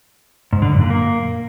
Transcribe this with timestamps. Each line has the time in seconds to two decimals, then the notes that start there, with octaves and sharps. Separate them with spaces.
0.53 G#2
0.62 D3
0.72 F#2
0.81 A#2
0.90 A#3